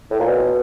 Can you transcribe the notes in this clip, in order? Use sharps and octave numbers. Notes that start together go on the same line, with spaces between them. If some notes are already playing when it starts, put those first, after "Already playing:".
A2
A#2
B2